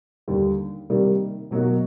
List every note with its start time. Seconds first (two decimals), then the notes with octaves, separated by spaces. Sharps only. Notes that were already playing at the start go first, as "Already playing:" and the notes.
0.28 D#2 D3 G3
0.90 C3 D#3 G3 A#3
1.51 B2 F#3 A#3 D#4 F#4